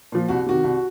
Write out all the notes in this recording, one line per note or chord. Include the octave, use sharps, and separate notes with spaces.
A#2 F3
C2 F#4
C3 D#3 F#4
C2